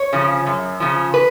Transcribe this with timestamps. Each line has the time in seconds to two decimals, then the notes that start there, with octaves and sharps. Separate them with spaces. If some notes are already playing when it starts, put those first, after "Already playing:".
Already playing: C#5
0.13 C#3 F3
0.46 F#2
0.80 C#3 F3
1.14 B4